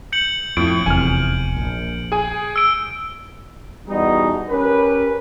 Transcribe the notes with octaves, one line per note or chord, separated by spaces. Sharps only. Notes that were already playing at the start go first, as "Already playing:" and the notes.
G6 C#7 F#7
F2 A2 D7
F1 E2 C3 G#5 F6
A#1
G#4 G#5
E6 D7
E2 B2 G3 D#4
C#4 G4 A#4 B4